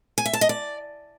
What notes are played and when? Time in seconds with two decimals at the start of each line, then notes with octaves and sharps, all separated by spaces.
0.18 G#5
0.26 E5
0.33 A5
0.41 D#5
0.49 D5